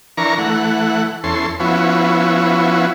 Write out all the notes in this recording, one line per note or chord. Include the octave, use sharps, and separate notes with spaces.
E3 D4 A#4 A#5 C#6
E3 A3 F#5
E2 C#4 A4 C6
F3 B3 C#4 E4 F#4